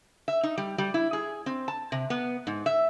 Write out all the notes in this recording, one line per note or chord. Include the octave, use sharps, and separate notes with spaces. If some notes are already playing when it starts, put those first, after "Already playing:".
E5
D#4
G3
G3
E4
G#4
C4
A5
C3
B3
G#2
E5